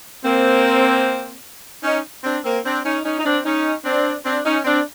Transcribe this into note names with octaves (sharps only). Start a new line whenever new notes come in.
A#3 C4
C#4 D#4
C4 D4
A#3 C4
C4 D4
C#4 D#4
C#4 D#4
D#4
C4 D4
C#4 D#4
C4 D4
C4 D4
C#4 D#4
C4 D4